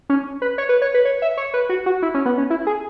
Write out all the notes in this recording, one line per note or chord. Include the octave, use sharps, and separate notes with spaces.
C#4
B4
C#5
B4
C#5
B4
C#5
E5
C#5
B4
F#4
F#4
E4
C#4
B3
C#4
E4
G#4